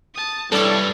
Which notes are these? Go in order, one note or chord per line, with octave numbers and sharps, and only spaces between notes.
A5 D#6
B1 G2 G3 E4 A4 C#5 D5